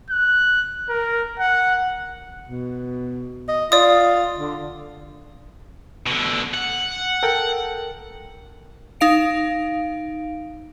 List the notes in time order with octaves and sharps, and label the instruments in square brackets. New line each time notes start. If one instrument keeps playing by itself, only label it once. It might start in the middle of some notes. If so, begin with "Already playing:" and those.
[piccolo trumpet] F#6
A#4
F#5
[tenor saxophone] B2
D#5
[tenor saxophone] F4 [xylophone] D5 D#6
[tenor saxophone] D3
[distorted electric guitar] B2 D3
F#5
[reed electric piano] A4 A#4 G5
[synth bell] D#4 F5 D7